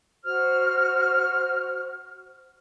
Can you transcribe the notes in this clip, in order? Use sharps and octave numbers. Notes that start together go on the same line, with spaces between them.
F#4 C5 F6